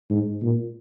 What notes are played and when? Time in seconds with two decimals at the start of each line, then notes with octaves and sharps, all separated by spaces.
0.10 G#2
0.42 A#2